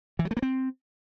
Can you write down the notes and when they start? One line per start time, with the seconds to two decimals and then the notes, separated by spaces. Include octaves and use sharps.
0.19 E3
0.25 F#3
0.31 A3
0.37 A#3
0.42 C4